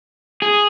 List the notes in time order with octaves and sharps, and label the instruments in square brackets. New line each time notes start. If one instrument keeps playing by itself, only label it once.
[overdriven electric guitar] G#4